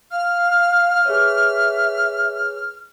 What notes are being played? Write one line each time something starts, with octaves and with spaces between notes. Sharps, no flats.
F5 F6
G#4 B4 C#5 E5